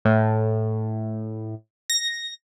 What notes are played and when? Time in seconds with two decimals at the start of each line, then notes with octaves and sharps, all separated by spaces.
0.05 A2
1.90 A#6